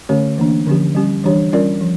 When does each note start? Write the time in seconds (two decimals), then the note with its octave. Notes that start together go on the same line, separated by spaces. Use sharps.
0.09 D3 A3 C#4 G4 C#5
0.38 E3 A#3 D4
0.66 D3 F3 C#4 G4
0.95 G3 C#4 G4
1.24 E3 G3 D4 G4 C#5
1.53 G3 C#4 F4 A#4 D5
1.81 F3